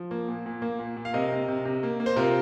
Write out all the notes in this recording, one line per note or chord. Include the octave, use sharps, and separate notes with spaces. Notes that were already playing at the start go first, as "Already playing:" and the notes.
Already playing: F3
A#3
A#2
A#2
A#3
A#2
A#2
F5
C3 A#4 D#5
C3
C3
C3
A#3
A#3
C5
C3 F4 A#4